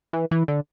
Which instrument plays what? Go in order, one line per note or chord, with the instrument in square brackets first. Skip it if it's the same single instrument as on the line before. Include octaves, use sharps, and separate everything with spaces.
[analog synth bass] E3
E3
D3